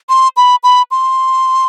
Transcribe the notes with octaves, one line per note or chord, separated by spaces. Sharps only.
C6
B5
B5
C6